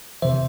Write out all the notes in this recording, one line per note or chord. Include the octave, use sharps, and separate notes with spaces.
C3 E3 C5 E5